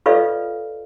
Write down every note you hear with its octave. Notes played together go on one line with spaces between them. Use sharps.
F4 A4 B4 D5 D#5 F5